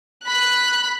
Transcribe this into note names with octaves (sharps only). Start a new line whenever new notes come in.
B5 F#6